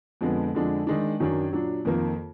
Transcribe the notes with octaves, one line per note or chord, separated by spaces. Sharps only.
F2 D3 G#3 B3
F2 D3 G#3 D4
D#3 G#3 D4
F#2 D#3 F#3 D4
A#2 F#3 D4
F2 D#3 A#3